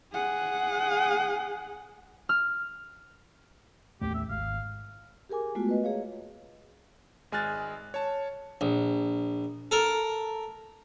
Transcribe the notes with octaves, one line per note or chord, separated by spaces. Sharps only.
G#4 F#5
F6
A1 D#2 A3 G4
E5
G#1 F5
G4 G#4 A#4 G#5 D6
G#3 A3 B3 F4 F#4
B4 D#5
A#3 G#4 C#5 F5
G#1 G#3 G#5 F6 F#6 A6
C#5 A5
A#1
A4 A#4